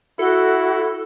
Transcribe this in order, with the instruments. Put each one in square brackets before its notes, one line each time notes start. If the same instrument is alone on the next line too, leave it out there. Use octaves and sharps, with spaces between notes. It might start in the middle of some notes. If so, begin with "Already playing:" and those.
[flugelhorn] E4 [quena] F#4 [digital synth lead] A4